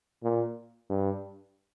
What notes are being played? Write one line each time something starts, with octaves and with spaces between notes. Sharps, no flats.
A#2
G2